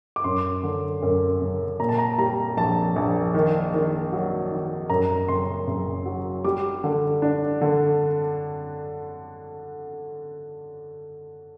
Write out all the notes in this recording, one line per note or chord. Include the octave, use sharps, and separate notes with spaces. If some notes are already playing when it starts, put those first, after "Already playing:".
D6
F#2 C6
D3
F#2
F#1
A#2 A#5
A5
A#5
G3 A#5
A#1 A5
A#1
D#3
D#3
F#3
D#3
F#2 A#5
F#1 C6
F#1
F#3
G3 D6
D3
D4
D3